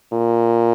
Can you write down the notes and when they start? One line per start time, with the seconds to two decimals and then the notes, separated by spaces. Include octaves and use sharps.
0.13 A#2